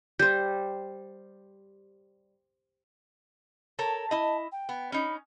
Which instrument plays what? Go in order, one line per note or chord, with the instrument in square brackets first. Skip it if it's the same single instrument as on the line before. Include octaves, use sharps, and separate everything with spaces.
[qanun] G3 C5 [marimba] G6
[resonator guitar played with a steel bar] A4 A#4 C#5 [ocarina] A5
[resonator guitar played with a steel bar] E4 D#5
[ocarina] G5
[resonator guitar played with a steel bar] B3
[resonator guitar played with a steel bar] C#4 D#4 [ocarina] B5